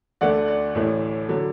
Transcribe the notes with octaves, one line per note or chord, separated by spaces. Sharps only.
D2 D3 A3 D5 F#5
D5
A1 A2 E3 A3
D3 F#3